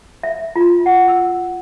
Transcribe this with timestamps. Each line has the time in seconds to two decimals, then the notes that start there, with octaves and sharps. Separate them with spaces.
0.23 E5
0.56 F4
0.86 F#5
1.08 E6